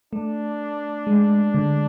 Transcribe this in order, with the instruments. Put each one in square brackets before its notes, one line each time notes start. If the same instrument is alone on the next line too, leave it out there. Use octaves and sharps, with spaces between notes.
[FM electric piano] A3 [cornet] D4
[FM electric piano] G#3
D3